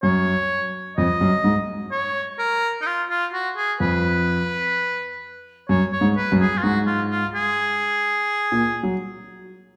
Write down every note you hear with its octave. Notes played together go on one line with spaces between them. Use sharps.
F#2 C#5
F2 D#5
F#2
G#2
C#5
A#4
D#4
F4
F4
F#4
G#4
F2 B4
F#2 C#5
C#5
G#2
B4
F#2
G#4
F4
G#2 F#4
F4
F4
G#4
A#2
F#3